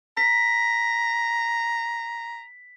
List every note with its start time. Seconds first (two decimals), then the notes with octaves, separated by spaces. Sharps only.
0.17 A#5 B6